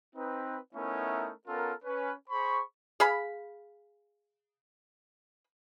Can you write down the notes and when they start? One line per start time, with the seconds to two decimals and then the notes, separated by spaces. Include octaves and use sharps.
0.16 C4 D#4 B4
0.75 A3 B3 C#4 D#4 E4 A#4
1.47 B3 C#4 F4 A4 A#4
1.84 C#4 B4
2.30 G#4 C5 B5 C#6
3.00 G#4 F5 B5